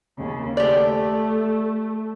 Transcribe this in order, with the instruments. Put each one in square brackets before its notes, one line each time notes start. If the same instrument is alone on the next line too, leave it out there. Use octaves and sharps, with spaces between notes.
[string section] D#2 C#3
[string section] A3 [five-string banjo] G4 D5